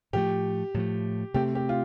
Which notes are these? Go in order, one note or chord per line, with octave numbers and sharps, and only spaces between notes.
A2 F3 A3 G4
A2 F3 A3
C3 A3 C4 G4
G4
F4